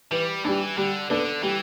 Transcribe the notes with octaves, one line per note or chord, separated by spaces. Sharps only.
E3 G3
E3 G3 D4
D3 G3
D3 B3 D4 A4 D5
E3 G3